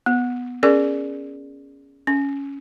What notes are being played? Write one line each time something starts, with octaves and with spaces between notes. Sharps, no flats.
B3
C#4 G#4 A#4 D5
C#4